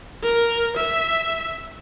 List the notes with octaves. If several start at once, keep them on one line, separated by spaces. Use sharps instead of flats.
A#4
E5